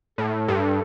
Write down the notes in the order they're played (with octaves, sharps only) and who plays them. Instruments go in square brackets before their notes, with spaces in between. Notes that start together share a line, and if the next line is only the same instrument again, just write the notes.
[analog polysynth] A2 [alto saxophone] A4
[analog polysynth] G2